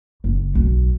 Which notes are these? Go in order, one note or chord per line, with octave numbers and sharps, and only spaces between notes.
F#1
B1